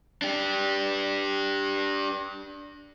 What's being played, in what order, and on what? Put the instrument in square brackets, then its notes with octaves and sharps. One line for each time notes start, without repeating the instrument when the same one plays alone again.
[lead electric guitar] D4 G4